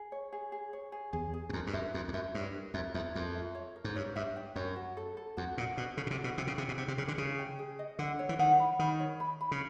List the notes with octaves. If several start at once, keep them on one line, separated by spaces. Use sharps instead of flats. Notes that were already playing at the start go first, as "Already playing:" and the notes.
Already playing: G#4
C#5
G#4
G#4
C#5
G#4
E2 G#4
G#4
F#2
F2 A#4
G2
F#2 E5
F2 A#4
F2
F#2 E5
G2 C#5
A#4
F2 E5
E2 E5
F2 A#4
E5
C#5
A#4
G#2
G2 C#5
G2 E5
G5
F#2 C#5
F#4
A4
A4
F2 F#4
A#2 F#4
B2 D4
C#3 A4
B2
C3
F#4
B2
C3 G5
C#3
C3 G#4
B2
C3 G5
C3
C#3 G#4
D3
C#3 G#4
G5
G#4
D#5
D3 F#5
C#5
E3
D#3 F#5
B5
D#3 B5
C#5
B5
B5
C#3